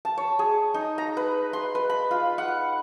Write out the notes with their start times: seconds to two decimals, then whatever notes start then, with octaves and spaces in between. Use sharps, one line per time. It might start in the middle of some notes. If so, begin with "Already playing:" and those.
0.05 A5
0.17 C#5
0.39 G#4
0.74 D#4
0.98 A#5
1.17 B4
1.53 C6
1.75 B4
1.90 B5
2.11 F4
2.38 F#5